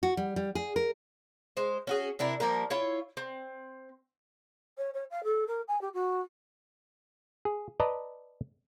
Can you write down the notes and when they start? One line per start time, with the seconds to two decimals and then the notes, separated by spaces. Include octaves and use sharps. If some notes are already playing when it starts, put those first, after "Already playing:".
0.03 F#4
0.17 G3
0.36 G3
0.55 G#4
0.76 A#4
1.57 G#3 C5
1.87 C#4 F#4 G#4
2.19 C3 D4 E4 A#4
2.40 F3 G3 A#3 A#4
2.70 E4 F4 C#5
3.17 C4
4.78 C#5
4.94 C#5
5.10 F5
5.24 A4
5.47 A#4
5.68 G#5
5.81 G4
5.93 F#4
7.45 G#4
7.80 B4 D5 D#5 A5 A#5